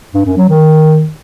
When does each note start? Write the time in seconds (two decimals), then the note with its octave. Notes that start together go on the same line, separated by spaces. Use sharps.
0.14 G2
0.26 F#2
0.37 F#3
0.49 D#3